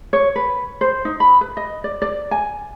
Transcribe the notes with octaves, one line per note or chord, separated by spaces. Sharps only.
C#5
B4
C5
D#4
B5
B4
D#5
D5
D5
G#5